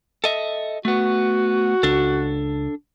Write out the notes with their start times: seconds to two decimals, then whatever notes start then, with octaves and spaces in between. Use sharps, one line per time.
0.24 A4 D#5 E5
0.85 A3 B3 F#4
1.83 C#2 D4 A4